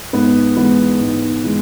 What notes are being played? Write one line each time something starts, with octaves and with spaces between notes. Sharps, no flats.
G#2 B3
E3 G#3 B3
G#2
E3 G#3